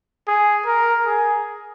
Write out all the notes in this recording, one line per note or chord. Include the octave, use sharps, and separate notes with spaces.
G#4
A#4
G#4